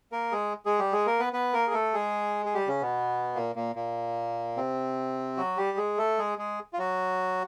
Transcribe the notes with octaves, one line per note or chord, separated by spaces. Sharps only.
A#3 A#4
G#3 G#4
G#3 G#4
G3 G4
G#3 G#4
A#3 A#4
B3 B4
B3 B4
A#3 A#4
G#4
A3 A4
G#3 G#4
G#4
G3 G4
C#3 C#4
B2 B3
A#2 A#3
A#2 A#3
A#2 A#3
C3 C4
F#3 F#4
G3 G4
G#3 G#4
A3 A4
G#3 G#4
G#3 G#4
F4
F#3 F#4